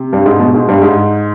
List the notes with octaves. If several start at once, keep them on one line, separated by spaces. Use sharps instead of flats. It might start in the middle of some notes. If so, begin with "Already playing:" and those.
Already playing: C3
G2
G#2
B2
G#2
G2
G#2